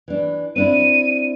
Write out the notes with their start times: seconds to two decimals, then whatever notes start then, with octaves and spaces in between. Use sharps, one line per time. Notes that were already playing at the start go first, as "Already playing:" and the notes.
0.08 E3 D4
0.56 C4 D4 E4 D#7